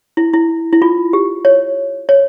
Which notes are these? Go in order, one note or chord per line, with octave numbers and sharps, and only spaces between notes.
E4
E4
E4
F4
G4
C#5
C#5